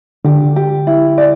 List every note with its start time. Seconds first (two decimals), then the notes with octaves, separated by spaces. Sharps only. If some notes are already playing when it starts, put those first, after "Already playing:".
0.25 D3 G4
0.56 G4
0.87 E4
1.18 D5